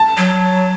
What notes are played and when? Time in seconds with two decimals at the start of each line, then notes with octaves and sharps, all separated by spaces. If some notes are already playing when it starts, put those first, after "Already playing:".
Already playing: A5
0.17 F#3